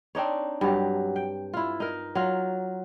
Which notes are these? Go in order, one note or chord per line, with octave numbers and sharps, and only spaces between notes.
C4 D4 D#4 C#5
G2 F#3 G4
G5
E4 F4
D#4 A#4
F#3 F4